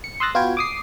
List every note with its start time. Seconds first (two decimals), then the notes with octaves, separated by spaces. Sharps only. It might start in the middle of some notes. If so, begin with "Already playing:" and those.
0.04 C#7
0.20 C6 D#6 E6 F#6 A6 A#6
0.35 B3 F4 F#4 B4 G5 G#6
0.57 D6 D#6 C7